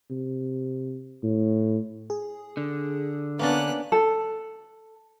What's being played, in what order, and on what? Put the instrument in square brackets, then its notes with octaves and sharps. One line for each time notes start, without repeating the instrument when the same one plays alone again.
[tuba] C3
A2
[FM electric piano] G#4
[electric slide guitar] D3
[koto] A#3 C#4 D4 [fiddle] B3 F#6
[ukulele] A4